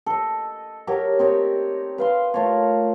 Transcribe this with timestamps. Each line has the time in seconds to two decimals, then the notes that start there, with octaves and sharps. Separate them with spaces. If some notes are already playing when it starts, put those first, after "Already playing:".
0.06 A4 D#5
0.87 F#3 G4 A#4 C#5
1.19 C4 D#4 C#5 D5
1.98 B4 F5 C6
2.34 A3 F4 A#4 C#5